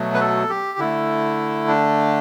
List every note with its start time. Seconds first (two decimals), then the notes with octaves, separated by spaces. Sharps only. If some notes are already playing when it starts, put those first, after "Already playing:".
Already playing: B2 F#3 A3
0.14 B4
0.20 A4
0.50 G4
0.79 D3 A3 E4
1.67 D4